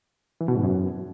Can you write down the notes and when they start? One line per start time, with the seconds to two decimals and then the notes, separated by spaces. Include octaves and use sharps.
0.41 E3
0.48 B2
0.56 G#2
0.63 F#2